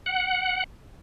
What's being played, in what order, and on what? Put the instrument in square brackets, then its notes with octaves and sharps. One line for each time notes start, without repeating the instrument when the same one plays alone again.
[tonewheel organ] F#5